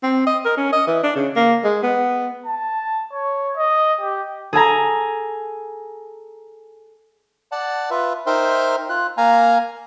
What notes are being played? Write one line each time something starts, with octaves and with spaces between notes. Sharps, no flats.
C4
D#5
A#4
C#4
D#5
E3
D4
C#3
A#3
G#3
B3
A5
C#5
D#5
G4
G#4 A4 G#5 A#5
D5 F#5 A5
F4 B4 E5
D#4 A#4 C5 E5 G5 C6
F4 F#6
A#3 F5 G#5 A#5